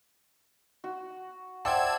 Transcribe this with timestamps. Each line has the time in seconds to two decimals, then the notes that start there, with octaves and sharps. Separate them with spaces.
0.84 F#4
1.65 C5 D5 E5 F#5 G5 A5 E6 G#6